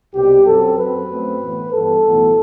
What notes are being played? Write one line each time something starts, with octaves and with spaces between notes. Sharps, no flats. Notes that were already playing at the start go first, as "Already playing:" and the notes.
C2 B2 G3 G4
F#2 F#3 C4 A4
F#2 F#3 C4 B4
F#2 F#3 A3 C4
A2 E3 B3
G2 E3 B3 A4
B1 A2 E3 B3